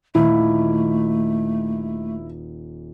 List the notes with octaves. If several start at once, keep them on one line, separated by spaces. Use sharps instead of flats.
D#1 A3 E4